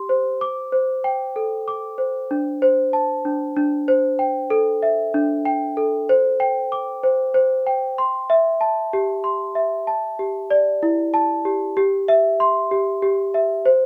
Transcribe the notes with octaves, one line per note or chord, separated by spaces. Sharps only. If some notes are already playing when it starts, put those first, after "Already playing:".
Already playing: G4 C6
C5
D6
C5
G5
A4
D6
C5
D4
C5
A5
D4
D4
C5
G5
A4
E5
D4
G5
A4
C5
G5
D6
C5
C5
G5
C6
E5
A5
G4
C6
E5
A5
G4
D5
E4
A5
G4
G4
E5
C6
G4
G4
E5
C5